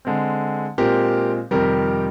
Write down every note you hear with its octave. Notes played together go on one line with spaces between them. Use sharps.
D3 G#3 C4
A#2 G#3 C4 G4 A#4
F2 C3 D#3 G3 G4 A#4